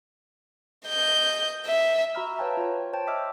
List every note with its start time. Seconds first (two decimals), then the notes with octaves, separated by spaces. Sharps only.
0.87 D#5 G6
1.66 E5
2.15 F#4 E5 A#5 B5 E6 F6
2.38 B4 C#5 F5 G5 A5 A#5
2.57 F4 C#5
2.93 C5 C#5 G5 A5
3.07 D#5 E5 D6 E6 F6